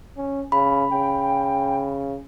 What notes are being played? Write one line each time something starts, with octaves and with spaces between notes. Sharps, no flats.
C#4
C#3 B5
C#3 G5